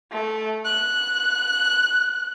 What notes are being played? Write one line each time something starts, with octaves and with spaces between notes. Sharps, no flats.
A3
F#6